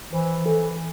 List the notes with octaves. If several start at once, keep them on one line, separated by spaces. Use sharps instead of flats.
E3 C5
E3 A4